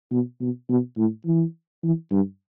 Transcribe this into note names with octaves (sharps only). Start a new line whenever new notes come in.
B2
B2
B2
A2
E3
E3
G2